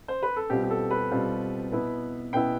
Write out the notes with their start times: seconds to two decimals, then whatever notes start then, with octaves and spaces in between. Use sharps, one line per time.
0.08 C5
0.23 B4
0.36 A4
0.50 B2 G3 C4 F4 G4
0.63 G4
0.70 A4
0.91 B4
1.11 B2 G3 C4 F4
1.72 B2 B3 E4
2.33 B2 B3 E4 G5